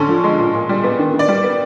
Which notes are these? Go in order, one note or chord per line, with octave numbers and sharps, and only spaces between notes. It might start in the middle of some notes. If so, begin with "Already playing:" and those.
Already playing: D3 C#4 A4
F3
G#3
A#2
A#2
G3
B3
D#3
D#3
D5
G3
B3